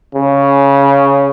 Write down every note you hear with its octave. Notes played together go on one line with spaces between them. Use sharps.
C#3